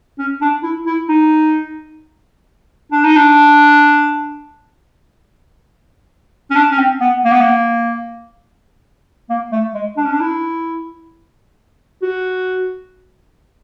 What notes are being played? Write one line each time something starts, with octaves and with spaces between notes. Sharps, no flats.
C#4
D4
E4
E4
D#4
D4
D#4
D4
C#4
D4
C#4
C4
B3
A#3
B3
A#3
A#3
A3
G#3
D4
C#4
D4
E4
F#4